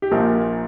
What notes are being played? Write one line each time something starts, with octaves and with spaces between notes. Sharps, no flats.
G4
A#1 A#2 F3 A#4